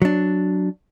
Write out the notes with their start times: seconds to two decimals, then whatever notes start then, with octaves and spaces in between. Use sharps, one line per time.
0.02 F#3 D4